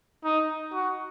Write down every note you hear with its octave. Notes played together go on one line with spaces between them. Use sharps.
D#4
F#4